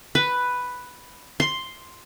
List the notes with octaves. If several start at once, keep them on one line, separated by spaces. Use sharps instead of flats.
B4
C6